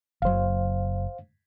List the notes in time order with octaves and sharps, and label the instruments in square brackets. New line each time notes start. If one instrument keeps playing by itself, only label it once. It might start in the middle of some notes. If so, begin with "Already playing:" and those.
[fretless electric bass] F#1 F#3 [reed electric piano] C5 F5